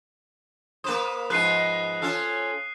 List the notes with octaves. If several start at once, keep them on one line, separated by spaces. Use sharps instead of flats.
A#3 B4 C5 D#6 E7
G#2 F3 B4 F#6 C7 D#7
C#4 F4 A4